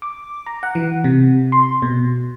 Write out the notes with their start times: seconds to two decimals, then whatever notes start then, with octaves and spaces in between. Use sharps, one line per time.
0.02 D6
0.47 A#5
0.63 F#5
0.75 E3
1.04 C3
1.52 C6
1.82 B2